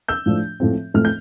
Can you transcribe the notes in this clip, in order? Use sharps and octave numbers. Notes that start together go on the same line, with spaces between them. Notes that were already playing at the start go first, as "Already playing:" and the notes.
E6 G6
A2 F3 A3 D4
A2 F3 A3 C4
A2 F3 A3 C4 F6
G6